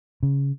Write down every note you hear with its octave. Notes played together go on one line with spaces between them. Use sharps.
C#3